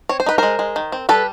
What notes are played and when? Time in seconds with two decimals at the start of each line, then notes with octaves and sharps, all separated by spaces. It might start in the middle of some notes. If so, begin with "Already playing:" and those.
0.09 C4 C#5
0.20 C5
0.26 D#4 B4
0.38 G#3 A#4 C5
0.59 G#3
0.76 D#3
0.92 C4
1.09 G3 A4 B4